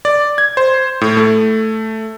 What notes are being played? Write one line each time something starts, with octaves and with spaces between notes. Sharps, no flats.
D5
G#6
C5
A2
A3